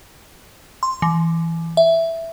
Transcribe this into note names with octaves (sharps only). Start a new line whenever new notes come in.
C6
E3
E5